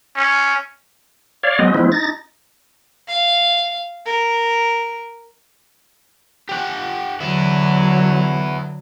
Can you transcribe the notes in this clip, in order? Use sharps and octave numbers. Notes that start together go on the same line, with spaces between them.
C#4
C#5 D5 F5
F#3 G#3 B3 C4 D#5
F3 G#3 B3 C4 E4
D#4 A6 A#6
F5
A#4
G4 F#5
D3 F#3 B3 E4